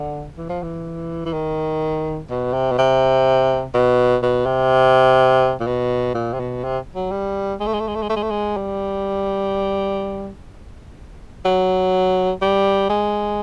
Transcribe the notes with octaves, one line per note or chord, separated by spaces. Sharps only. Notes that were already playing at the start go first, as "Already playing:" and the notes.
Already playing: D3
E3
F3
E3
E3
D#3
B2
C3
B2
C3
B2
B2
C3
A#2
B2
A#2
C3
B2
C3
F#3
G3
G#3
A3
G#3
A3
G#3
A3
G#3
A3
G#3
A3
G#3
G3
F#3
G3
G#3